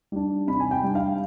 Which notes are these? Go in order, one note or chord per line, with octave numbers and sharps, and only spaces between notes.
G3 D4
C3 B5
G#5
G5
G3 D4
F5